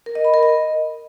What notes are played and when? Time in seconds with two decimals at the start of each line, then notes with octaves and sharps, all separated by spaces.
0.06 A#4
0.15 D#5
0.25 B5
0.34 A#4
0.43 D#5